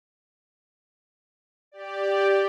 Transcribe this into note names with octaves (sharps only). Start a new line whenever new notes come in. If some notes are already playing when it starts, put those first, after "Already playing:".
G4 D5